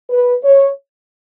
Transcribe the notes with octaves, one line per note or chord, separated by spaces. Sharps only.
B4
C#5